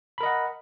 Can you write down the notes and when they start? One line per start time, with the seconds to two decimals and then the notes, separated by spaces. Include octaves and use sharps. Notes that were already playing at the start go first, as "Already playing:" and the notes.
0.18 B5
0.21 A#4
0.23 D#5
0.26 F#5